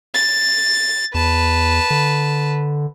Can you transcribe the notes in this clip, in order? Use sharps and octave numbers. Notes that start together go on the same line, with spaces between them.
A6
E2 B4 A5
D3